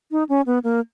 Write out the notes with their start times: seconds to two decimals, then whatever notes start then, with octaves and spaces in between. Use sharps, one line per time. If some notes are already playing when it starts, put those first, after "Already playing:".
0.11 D#4
0.29 C#4
0.46 B3
0.64 A#3